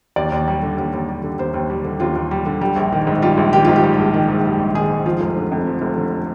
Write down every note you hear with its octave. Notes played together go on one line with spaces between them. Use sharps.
D#2 D5
D#2
G3
D3
D#2
D#2
G3
D3
D#2 C5
D#2
G3
D3
D#2 F4
D#2
G3
D3
G3
A#1
D#3
G#2
G3 F4
A#1
D#3 G4
G#2 F4
G4
G3
A#1
D#3
G#2
G3
A#1
D#3 G#4
G#2
F3 F4
F1
D3
F2
F3
F1
D3